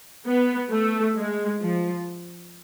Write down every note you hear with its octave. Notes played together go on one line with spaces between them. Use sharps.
B3
A3
G#3
F3